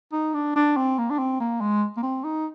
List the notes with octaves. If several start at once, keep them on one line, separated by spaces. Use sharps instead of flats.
D#4
D4
D4
C4
A#3
D4
C4
A#3
G#3
A#3
C4
D#4